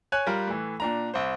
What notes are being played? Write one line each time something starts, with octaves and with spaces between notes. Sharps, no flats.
C#5 G#5 F#6
G3 F4 A#4
A2 E3
A#2 D4 A#5
C2 C5